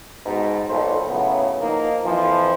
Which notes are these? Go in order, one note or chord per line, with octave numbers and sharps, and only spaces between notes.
G#2 B2
B1 A#2 A4 C5
A2 C#3 F#3 B3
F3 A#3 D#4
F2 E3 F3